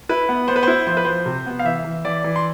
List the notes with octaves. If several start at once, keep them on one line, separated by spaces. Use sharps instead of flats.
E4 B4
B3
B3 C5
B4
E4 C5
F3 C5
B4
F3 C5
C3
B3
F5
E3 E5
E3
E3 D5
E3
C6